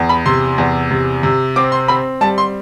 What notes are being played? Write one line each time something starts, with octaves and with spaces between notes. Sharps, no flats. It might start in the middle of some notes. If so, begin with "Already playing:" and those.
Already playing: E2
B5
C3 C6
E2
C3
C3
C4 D6
C6
C4 B5
G3 A5
C6